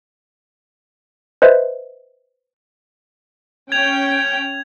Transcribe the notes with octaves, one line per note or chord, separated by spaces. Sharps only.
B4 C5 D#5 E5
C#4 G5 G#6 F7